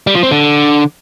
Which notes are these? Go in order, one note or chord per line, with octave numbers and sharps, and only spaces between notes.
G3
F3
C4
D3